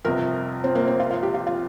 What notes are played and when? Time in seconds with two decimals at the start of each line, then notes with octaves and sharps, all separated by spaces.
0.05 G1 F2 C3 A#4
0.64 C4
0.75 A#3
0.88 C4
1.00 F4
1.11 F4
1.23 G4
1.34 F4
1.47 F4